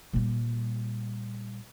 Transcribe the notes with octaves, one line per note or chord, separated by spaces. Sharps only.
A#2 G3